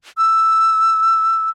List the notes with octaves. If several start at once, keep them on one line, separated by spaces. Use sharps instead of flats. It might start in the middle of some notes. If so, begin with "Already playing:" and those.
E6